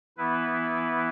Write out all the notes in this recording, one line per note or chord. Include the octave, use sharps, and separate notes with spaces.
E3 B3 E4 B4